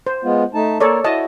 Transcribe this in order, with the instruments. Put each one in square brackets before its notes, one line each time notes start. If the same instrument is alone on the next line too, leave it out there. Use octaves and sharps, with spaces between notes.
[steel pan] C5
[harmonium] G#3 B3 F4
A3 D#4 A5
[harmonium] A#3 A#4 [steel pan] A4 C#5 D5
[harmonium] E4 F#4 [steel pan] D#5 A5